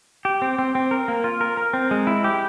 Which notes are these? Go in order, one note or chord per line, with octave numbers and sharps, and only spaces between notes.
G4
C4
C4
C4
A#4
A#3
F4
A#4
A#4
C4
G#3
E4
G4